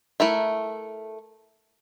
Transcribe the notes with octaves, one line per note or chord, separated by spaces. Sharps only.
A3 E4 A#4 E5